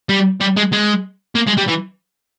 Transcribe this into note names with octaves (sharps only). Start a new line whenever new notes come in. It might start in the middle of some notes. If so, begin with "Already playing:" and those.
G3
G3
G#3
G#3
A#3
G#3
G3
E3